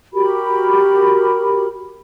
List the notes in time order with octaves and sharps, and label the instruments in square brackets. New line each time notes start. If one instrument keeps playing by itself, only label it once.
[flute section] F#4 G4 A#4 B5